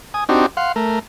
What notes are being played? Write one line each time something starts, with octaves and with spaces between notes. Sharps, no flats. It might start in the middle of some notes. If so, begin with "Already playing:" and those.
G#5 D#6
C4 D4 D#4 F#4 G4
F5 F#5 C6
A3 A#4